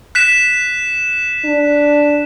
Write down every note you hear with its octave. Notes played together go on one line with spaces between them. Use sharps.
F#6 B6 E7
D4